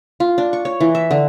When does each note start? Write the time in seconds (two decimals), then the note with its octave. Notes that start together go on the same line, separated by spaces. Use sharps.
0.20 F4
0.38 D4
0.53 C#6
0.65 C#5
0.80 E3
0.95 E5
1.11 D3